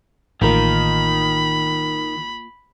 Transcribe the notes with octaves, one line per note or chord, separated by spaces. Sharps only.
A1 D#3 A#3 F4 A#4 B5